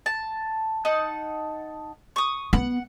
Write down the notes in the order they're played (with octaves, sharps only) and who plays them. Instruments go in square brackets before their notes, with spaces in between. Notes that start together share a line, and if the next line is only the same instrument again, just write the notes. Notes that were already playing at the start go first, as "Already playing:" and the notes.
[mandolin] A5
D#4 F#5 A5
C#6 D#6
[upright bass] B3 [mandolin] F#5